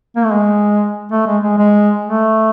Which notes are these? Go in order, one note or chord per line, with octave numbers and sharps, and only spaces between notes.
A#3
A3
G#3
A3
G#3
G#3
G#3
A3